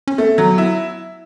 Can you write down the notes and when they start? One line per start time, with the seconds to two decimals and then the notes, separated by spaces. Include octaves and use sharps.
0.08 C#4
0.18 A3 B3
0.38 F#3
0.58 E4